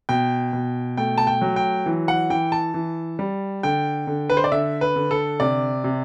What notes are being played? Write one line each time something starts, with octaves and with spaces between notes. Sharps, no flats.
B2 G5
B2
A3 G5
A5
G5
F#3
G5
E3
F#5
E3 G5
A5
E3
G3
D3 G5
D3
B4
C5
D5
D3 E5
B4
D3
A4
C3 D5
C3